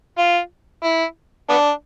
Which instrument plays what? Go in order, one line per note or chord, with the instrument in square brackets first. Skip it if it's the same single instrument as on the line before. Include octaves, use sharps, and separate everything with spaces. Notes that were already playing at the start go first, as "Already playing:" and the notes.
[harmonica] F4
E4
B3 D4